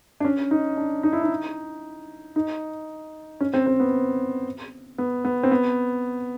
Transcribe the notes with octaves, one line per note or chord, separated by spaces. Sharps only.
D4
C#4
D#4
D4
D#4
E4
D#4
D#4
C#4
C4
C4
B3
B3
B3
C4
B3